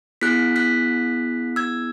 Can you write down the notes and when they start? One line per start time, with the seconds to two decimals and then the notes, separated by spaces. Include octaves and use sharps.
0.21 B3 E4 G#4 F#6 B6
0.56 F#6 B6
1.56 E6 G#6